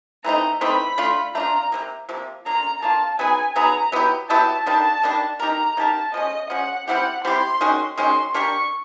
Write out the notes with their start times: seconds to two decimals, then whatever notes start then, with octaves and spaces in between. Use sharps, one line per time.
0.24 E3 A3 C4 D#4 A#5
0.61 E3 A3 C4 D#4 B5
0.98 A3 D4 F4
1.35 A3 D4 F4 A#5
1.72 C3 F3 A#3
2.09 C3 F3 A#3
2.45 A#3 D4 F4 A#5
2.82 A#3 D4 F4 A5
3.19 F#3 B3 D#4 G#4 G#5
3.56 F#3 B3 D#4 G#4 A#5
3.92 F#3 B3 E4 G4
4.30 F#3 B3 E4 G4 A5
4.66 D#3 G3 A#3 D4 A5
5.03 D#3 G3 A#3 D4
5.39 A#3 D#4 G4 A#4 A#5
5.77 A#3 D#4 G4 A#4 A5
6.14 F3 G#3 C#4 D#5
6.50 F3 G#3 C#4 F#5
6.88 G3 C4 E4 G4 F#5
7.24 G3 C4 E4 G4 C6
7.61 D#3 G#3 C#4 F#4
7.97 D#3 G#3 C#4 F#4 C6
8.34 A#3 D4 G4 A#4 C#6